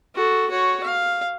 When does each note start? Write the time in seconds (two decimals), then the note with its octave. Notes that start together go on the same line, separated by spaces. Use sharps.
0.15 F#4 A4
0.50 F#4 C#5
0.84 F5